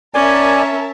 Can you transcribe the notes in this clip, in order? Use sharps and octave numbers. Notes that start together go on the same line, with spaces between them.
C#4 A#4 D5 E5 G#5 A5